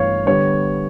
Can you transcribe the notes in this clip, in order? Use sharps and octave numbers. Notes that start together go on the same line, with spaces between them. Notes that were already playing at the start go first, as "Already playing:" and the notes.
Already playing: G1 G2 E3 A3 C#5 F5
D3 G3 B3 C#5